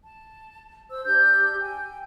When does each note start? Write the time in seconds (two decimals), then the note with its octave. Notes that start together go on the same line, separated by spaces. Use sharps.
0.03 A5
0.91 C5 E6
1.05 D4 G4 E6 G6
1.60 G5 G#5